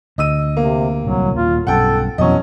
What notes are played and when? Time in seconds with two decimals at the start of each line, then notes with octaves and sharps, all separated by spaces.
0.18 D2 D#5 E6 D#7
0.57 C3 A#3
1.05 D1 C2 F#3
1.36 D#1 A#3 F4
1.67 B1 G2 C#4 A4 F#5 G5
2.18 F2 B2 E3 F#3 C#4 D#5